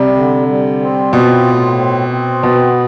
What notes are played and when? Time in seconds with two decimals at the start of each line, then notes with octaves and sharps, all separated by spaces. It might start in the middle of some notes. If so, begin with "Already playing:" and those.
Already playing: C3 G3
0.17 D3
0.48 G3
0.81 C4
1.13 B2 F4
1.46 A2
1.78 C4
2.11 C4
2.42 B2 B3